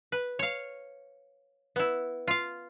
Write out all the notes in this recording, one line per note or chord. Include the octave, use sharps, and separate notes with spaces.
B4
C#5 F5
B3 E4
F4 F5